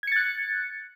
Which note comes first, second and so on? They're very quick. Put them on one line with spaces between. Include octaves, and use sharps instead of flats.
G#6 C#7 A6 F#6